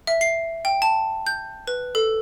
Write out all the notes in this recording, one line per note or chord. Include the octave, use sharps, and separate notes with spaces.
E5
C7
G5
A5
G6
B4
A4